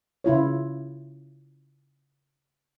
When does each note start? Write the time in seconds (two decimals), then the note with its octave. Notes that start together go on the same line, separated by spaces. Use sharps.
0.24 C#3 E4 F4 C#5